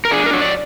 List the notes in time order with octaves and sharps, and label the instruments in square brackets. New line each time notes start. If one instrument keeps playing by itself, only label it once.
[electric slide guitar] A#4
D4 G#4
A#4
F#3
D5